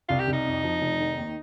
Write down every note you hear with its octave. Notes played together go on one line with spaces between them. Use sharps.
C2 F4
G4
C2
D#4
F2
F3
F1
D#3
D#2